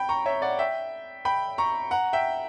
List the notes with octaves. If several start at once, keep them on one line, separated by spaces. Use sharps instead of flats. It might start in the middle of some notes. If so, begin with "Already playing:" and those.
Already playing: G5 B5
A#5 C#6
C#5 E5
D5 F#5
E5 G5
G5 B5
A#5 C#6
F#5 A#5
E5 G5